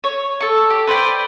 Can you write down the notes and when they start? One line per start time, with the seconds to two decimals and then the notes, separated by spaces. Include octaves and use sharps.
0.04 C#5
0.40 A4 C#6
0.70 G4
0.87 B4 C5 D5 G5